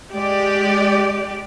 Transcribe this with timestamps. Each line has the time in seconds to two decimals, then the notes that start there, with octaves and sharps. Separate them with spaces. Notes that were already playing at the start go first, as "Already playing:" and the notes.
0.14 G#3 G4 D5